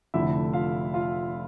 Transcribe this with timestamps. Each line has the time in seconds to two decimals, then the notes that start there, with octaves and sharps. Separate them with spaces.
0.14 F1 F2 D3 A3 E4 E5
0.53 F4 F5
0.94 F4 F5